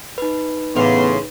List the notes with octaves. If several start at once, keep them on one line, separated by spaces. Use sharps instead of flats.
D#4 B4
A2 C#3 E3 B3 F5 C6